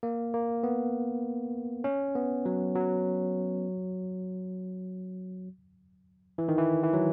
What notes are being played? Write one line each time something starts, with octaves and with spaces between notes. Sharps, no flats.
A#3
A#3
B3
C#4
B3
F#3
F#3
E3
D#3
E3
E3
F#3